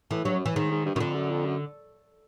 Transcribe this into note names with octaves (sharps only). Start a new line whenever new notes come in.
A2 E3
G2 F#3
F#2
E3
G#2 D#3
G#2
G2
F#2 D#3
F2 D3
F#2
F2
F#2